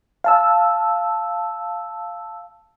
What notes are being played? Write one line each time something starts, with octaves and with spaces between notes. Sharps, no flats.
F5 A5 E6